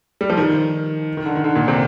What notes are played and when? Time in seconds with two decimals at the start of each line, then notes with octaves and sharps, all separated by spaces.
0.21 G3
0.30 F3
0.37 D#3
1.17 D#3
1.25 D3
1.35 D#3
1.44 D3
1.55 A#2
1.68 C3